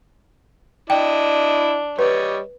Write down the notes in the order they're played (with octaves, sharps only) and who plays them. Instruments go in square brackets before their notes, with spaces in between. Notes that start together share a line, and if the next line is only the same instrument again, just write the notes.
[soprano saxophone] D4 [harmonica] E4 D#5 [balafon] G5
[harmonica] G3 C#5 D#5 [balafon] B4